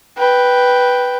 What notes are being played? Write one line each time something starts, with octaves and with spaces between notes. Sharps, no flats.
B4 G5